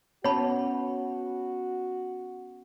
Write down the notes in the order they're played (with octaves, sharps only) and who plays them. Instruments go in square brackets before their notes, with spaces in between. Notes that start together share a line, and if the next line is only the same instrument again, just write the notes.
[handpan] B3 C#4 [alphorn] F#4 [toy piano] C#5 A5 B5